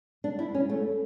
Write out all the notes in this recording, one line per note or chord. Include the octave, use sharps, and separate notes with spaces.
D4
E4
C#4
A3